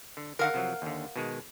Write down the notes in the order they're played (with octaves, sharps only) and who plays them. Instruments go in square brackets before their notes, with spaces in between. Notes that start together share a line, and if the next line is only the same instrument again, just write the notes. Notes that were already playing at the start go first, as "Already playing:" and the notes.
[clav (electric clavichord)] D3
[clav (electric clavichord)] D3 D#3 [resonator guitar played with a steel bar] A#4 F5 F#5
[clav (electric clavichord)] C3 F3 F#3
D#2 D3
B2 D#3 G#3